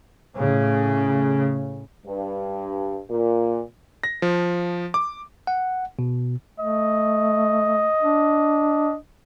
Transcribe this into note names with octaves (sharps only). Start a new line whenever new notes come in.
A2 C#3
G2
A#2
A#6
F3
D6
F#5
B2
A3 D#5
D4